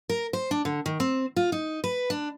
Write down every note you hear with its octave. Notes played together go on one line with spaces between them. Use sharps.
A#4
C5
D4
D3
D#3
C4
F4
D#4
B4
D4